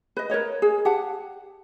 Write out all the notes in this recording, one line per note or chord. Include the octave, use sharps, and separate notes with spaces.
B4 D#5
A#4 B4 C#5 D#5
G#4
G4 F#5 A5